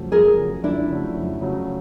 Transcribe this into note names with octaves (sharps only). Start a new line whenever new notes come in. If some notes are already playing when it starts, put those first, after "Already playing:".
Already playing: F2 C#3 F#3 A3
F2 G#4 A#4
C#3 F#3 A3
F2 D4 E4
C#3 F#3 A3
F2
C#3 F#3 A3